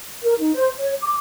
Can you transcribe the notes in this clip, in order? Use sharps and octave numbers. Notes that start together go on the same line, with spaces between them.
A#4
D#4
C5
C#5
D6